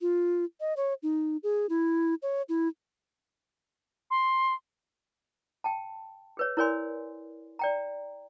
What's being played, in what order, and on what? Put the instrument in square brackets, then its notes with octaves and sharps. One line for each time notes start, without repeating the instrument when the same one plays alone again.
[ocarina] F4
D#5
C#5
D#4
G#4
E4
C#5
E4
[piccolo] C6
[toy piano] G5 A5
G#4 B4 C#5
E4 A#4 C#5 D5 G#5 C6
D5 G5 A#5